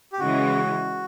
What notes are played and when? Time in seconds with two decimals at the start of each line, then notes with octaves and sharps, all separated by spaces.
0.13 G4
0.20 C#3 E3 G#3 F#4